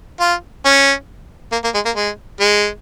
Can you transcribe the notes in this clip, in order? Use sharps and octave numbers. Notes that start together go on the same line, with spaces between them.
F4
C#4
A#3
A#3
G#3
A#3
G#3
G#3